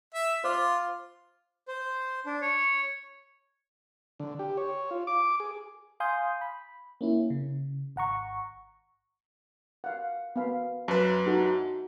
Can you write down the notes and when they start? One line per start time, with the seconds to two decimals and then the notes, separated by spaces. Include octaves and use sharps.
0.14 E5
0.44 F4 C5 D6
1.68 C5
2.26 D4
2.42 C#5
4.20 D3
4.39 G4
4.57 C#5
4.91 F4
5.07 D6
5.40 G#4
6.00 F5 G#5 C6 D#6 G6
6.41 B5
7.01 A#3 C#4 E4
7.30 C#3
7.96 G#1 F#5 A#5 C#6
9.84 F5 F#5
10.36 B3 F5 B5
10.88 F#2 B4 A5
11.26 D#4 F#4 A4